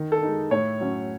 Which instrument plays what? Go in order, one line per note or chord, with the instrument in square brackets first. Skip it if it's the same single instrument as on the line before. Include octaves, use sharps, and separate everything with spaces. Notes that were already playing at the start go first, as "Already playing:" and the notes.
Already playing: [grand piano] D#3
A4
G#3 D#4
A2 C#5
F#3 C#4